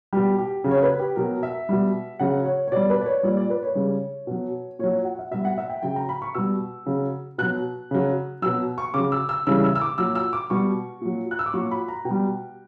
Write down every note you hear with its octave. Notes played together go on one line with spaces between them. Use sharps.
B2 G3 G4
G4
C#3 F#3
C#5
B4
G4
B2 F#3 A#4
E5
B2 G3
C#3 F#3 F#5
C#5
C#5
B2 G3 D5
B4
D5
C#5
A#2 G3 D5
D5
B4
C#5
C#3 G3
B2 F#3
A#2 F#3 C#5
F#5
E5
B2 G3 E5
F#5
E5
G5
C#3 F#3 G5
A#5
B5
C#6
B2 G3 E6
C#3 F#3
B2 F#3 F#6
C#3 F#3
B2 F#3 E6
C#6
C#3 F#3 D6
E6
E6
C#3 E3 G3 E6
E6
E6
D6
A#2 F#3 E6
E6
D6
B2 G3 C#6
A#2 F#3
F#6
E6
D6
A#2 F#3 C#6
B5
A#5
B2 G5
G3